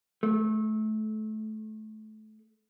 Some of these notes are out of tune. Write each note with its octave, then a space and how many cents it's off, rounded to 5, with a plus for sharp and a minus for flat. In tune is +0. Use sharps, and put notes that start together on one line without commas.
A3 -25